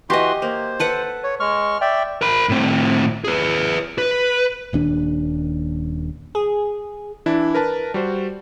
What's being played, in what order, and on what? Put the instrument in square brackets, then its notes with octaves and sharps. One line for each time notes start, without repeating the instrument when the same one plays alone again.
[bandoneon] E3 F#4 C6 [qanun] G4 D#5
[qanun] A#3 [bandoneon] C5
[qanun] A4 B4 F#5
[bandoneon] C#5
G#3 C#6 F6
D5 E5 G5
[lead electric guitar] A#4 B5
A2 C4
G#4 B4
B4
[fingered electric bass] D#1 D#2 D4
[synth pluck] G#4
[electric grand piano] E3 D4 E4
A#4 B4 A5
G3 F#4 C5